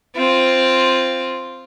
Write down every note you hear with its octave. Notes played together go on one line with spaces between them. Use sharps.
C4 F4